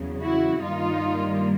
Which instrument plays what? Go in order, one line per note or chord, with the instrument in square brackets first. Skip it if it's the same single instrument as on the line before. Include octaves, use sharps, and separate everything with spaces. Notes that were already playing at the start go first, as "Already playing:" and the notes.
Already playing: [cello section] E2 C#3 F#3
E4 F#4
G2 D#3 G3 A#3 D#4 F4